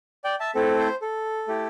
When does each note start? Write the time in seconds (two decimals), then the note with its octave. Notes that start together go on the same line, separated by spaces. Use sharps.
0.24 D5 G5
0.40 E5 A5
0.55 A3 C4 E4 A4
0.79 C5
1.02 A4
1.48 A3 E4 G4